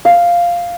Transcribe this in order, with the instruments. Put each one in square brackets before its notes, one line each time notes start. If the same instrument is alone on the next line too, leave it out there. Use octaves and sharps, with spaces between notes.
[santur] F5